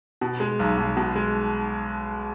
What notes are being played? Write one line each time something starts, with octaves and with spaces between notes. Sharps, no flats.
B2
G#3
B1
B1
B2
G#3